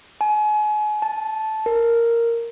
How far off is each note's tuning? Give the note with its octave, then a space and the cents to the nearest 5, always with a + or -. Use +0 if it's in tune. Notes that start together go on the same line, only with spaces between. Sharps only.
G#5 +35
A5 -10
A#4 -5